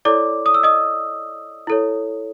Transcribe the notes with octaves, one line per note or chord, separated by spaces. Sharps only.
E4 A4 C#5 D5 D6
D#6
E6
D#5 D#6
E4 A4 C#5